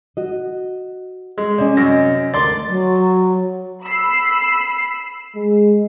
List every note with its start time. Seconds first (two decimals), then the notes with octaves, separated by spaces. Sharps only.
0.17 F#4 D#5
1.38 G#3
1.58 C3 C#4 D5 D#5
1.77 F#2 A#6
2.34 D2 A#4 D5 C6 A6
2.67 F#3
3.84 B5 E6 C7
5.35 G#3